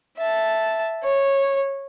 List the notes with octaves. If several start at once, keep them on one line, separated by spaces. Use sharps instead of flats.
E5 A5
C#5